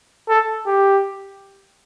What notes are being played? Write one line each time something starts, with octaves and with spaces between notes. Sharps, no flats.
A4
G4